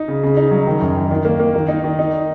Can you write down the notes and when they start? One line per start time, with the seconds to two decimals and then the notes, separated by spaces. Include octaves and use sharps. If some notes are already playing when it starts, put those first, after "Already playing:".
Already playing: D#4
0.08 C#3
0.23 C#3
0.37 D#4
0.51 F#3
0.67 D#3
0.81 F#2
0.96 D#3
1.11 D#3
1.25 A#3
1.40 A#3
1.55 D#3
1.68 D#4
1.84 D#3
1.99 D#4